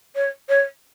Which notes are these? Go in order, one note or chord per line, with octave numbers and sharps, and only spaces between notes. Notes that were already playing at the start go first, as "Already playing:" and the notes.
C#5
C#5